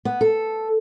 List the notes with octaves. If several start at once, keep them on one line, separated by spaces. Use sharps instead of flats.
B3
A4